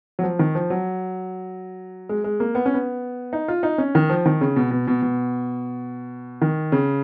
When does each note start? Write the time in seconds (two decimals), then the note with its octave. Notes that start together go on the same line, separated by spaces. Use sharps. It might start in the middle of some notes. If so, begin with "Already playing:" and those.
0.19 F#3
0.23 F3
0.39 D#3
0.55 F3
0.70 F#3
2.09 G#3
2.24 G#3
2.40 A#3
2.55 B3
2.66 C#4
2.74 B3
3.33 D#4
3.48 F4
3.63 D#4
3.78 C#4
3.95 D#3
4.09 F3
4.26 D#3
4.41 C#3
4.56 B2
4.71 B2
4.87 B2
5.02 B2
6.42 D#3
6.72 C#3